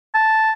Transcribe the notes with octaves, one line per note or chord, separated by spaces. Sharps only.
A5